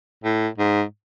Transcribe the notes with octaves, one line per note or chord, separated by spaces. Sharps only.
A2
G#2